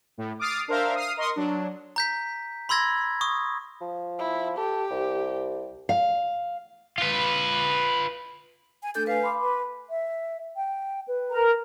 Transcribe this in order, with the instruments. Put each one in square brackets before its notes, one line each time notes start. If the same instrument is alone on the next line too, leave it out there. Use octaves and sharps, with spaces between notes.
[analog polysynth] A2
D6 D#6 F6 A6 C7
D4 A#4 C5 E5 F5
D#6 F6 C7 D#7
A#4 D#5 C6 C#6 D#6
F#3 D4
[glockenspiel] A#5 G6 B6
B5 C6 E6 G#6 A#6
C#6 D#6
[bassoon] F3
[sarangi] E4
[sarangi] G4 [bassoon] A4
[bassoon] C2
[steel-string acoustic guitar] F5
[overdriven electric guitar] F4 B4
[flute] G#5
[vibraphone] A3 D4 A4 [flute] G6
[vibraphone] B4 G#5 [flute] F5
[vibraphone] B5 C6 D6
[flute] B4
[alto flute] E5
G5
B4
[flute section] A#4 A#5